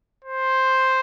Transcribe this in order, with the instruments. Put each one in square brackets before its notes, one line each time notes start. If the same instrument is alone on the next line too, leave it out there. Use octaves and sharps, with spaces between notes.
[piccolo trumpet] C5